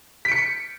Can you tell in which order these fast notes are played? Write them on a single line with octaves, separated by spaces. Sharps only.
B6 D7 C#7